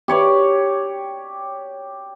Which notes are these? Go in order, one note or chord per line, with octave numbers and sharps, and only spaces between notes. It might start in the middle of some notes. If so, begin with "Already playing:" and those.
G4 C#5 D5